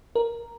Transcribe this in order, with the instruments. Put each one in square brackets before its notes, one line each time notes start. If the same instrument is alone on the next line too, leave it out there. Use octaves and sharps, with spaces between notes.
[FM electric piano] A#4